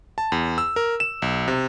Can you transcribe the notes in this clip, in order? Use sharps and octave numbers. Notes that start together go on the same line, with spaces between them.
A5
E2
E6
A#4
E7
B1
C3